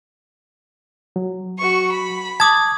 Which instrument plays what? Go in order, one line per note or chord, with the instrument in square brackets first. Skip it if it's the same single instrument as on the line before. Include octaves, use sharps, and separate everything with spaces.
[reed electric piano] F#3
[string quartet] F#4 C#6
B5
[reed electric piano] A5 [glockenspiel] D6 D#6 G#6